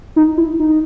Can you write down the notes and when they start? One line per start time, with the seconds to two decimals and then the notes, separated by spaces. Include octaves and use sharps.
0.16 D#4
0.38 E4
0.60 D#4